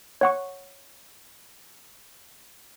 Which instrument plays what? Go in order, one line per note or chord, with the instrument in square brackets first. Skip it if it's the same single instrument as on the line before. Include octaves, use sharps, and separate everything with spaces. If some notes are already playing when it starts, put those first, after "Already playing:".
[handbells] C#5 F#5 C#6